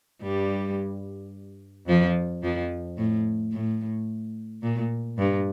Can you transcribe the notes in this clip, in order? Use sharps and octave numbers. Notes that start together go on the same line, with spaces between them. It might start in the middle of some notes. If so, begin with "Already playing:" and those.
G2 G3
F2 F3
F2 F3
A2
A2
A#2
G2